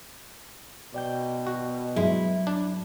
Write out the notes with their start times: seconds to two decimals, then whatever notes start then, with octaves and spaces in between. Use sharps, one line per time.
0.94 B2 D5 G5 G6
1.47 F#4
1.96 G2 F#3 G#3 E4
2.47 D4